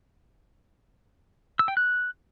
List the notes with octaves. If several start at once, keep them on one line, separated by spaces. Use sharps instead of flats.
E6
G5
F#6